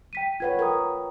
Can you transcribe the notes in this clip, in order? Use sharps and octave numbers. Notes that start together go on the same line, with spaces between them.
G5 B6 D#7
F4 B4 C#5 F#5 G#6
A#4 G5 D#6